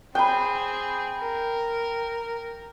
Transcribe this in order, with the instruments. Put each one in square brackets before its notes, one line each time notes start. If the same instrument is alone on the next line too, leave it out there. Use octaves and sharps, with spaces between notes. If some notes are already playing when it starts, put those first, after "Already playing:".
[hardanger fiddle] C4 G#4 [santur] G5 B5
[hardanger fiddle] A#4